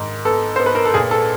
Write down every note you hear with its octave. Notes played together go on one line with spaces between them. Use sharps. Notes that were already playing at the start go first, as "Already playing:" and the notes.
Already playing: G#2 D#3
B3 A4
B3 C5
B4
A#4
A4
A#2 G#4
A4